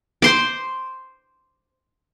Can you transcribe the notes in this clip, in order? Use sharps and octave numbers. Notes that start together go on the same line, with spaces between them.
C5 C6 D6